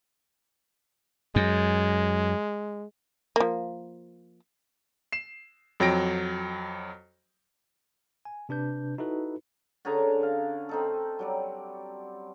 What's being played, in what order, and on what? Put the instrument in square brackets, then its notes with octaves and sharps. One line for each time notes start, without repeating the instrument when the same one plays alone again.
[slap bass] F#2 [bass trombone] G#3
[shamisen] F3 A#3
[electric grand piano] C7 E7
F2 F#3 G5 A#6 D7
[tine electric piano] G#5
C3 D4 B4 G6
D#4 E4 F#4 A4 B4
[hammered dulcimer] D3 C#4 G#4 A#5
F5
C4 D#4 A4
F#3 G3 D5